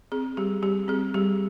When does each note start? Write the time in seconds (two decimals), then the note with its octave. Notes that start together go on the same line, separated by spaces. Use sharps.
0.12 C4 G#4
0.37 G3 G4
0.62 G3 G4
0.88 C4 G#4
1.14 G3 G4